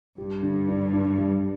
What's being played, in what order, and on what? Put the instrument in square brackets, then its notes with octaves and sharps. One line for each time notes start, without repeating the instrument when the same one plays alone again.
[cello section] G2 [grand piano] G4
[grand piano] D3
D4
D4
G3